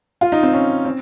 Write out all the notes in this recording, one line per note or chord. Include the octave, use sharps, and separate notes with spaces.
F4
D#4
C4
C#4
C4